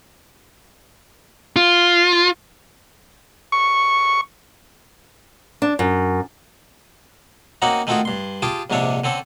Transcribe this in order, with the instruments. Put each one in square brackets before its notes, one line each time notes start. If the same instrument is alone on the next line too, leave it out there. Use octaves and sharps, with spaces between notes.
[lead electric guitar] F4
[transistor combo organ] C#6
[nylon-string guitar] D4
F#2
[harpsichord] A#3 C4 C#4 D#4 F#4 F#5
D#3 A3 C4 F4 F#4 G#4
G2 C6
F4 G4 G#4 G5 A5
A#1 G#2 C3 D4 C#5 E5
D3 C4 C#4 A4